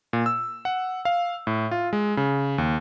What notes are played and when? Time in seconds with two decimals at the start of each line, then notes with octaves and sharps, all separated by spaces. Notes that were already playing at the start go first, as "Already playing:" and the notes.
0.13 A#2
0.26 E6
0.65 F#5
1.05 F5
1.47 A2
1.71 F4
1.93 G#3
2.17 C#3
2.58 D#2